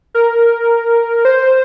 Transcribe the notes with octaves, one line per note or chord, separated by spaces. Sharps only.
A#4
C5